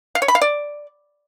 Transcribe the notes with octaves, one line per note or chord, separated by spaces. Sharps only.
F5
C#5
B5
F5
D5